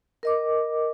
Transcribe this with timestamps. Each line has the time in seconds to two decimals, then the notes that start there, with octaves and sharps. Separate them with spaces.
0.23 A#4 D#5 D6